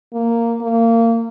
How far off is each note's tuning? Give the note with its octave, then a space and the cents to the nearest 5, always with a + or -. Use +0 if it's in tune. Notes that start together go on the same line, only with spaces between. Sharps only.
A#3 -10
A#3 -25